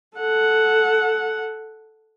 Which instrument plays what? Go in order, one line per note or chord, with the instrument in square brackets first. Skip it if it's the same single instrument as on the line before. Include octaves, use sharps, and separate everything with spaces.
[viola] A4 F#5